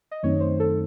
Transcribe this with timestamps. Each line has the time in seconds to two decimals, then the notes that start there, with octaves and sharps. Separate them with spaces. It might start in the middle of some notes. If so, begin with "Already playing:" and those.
0.11 D#5
0.23 F#2 D#3 A3 C4 D#4 C#5
0.40 C5
0.60 A4